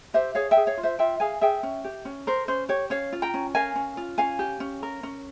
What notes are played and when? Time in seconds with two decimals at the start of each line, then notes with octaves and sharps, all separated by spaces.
0.14 G4 C5 E5
0.35 G#4 C#5 F5
0.51 E5 G5
0.57 G#4
0.67 C#5 F5
0.78 F4
0.83 C5 E5
0.99 F4 E5 G5
1.20 G#4 F5 G#5
1.41 G#4 E5 G5
1.63 C#4
1.84 G4
2.05 C#4
2.27 A#4 C5
2.48 C#4 C5
2.69 G4 C#5
2.90 C#4 C#5 F5
3.13 F4
3.22 G5 A#5
3.34 C#4
3.55 A#4 F5 G#5
3.76 C#4
3.97 F4
4.18 C#4 F5 G#5
4.39 G4
4.60 C#4
4.83 A#4
5.03 C#4